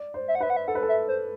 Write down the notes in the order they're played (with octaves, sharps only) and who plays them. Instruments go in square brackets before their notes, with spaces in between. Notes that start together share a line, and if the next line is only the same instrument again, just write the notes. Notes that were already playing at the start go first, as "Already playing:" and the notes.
Already playing: [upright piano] D5
C5
[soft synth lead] E5
F#5
[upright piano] B4 [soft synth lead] E5
[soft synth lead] F#5
E5
[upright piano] A4 [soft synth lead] F#5
[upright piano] B4
A4
[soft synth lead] E5
C5